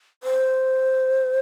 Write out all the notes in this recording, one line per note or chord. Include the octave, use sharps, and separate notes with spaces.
C5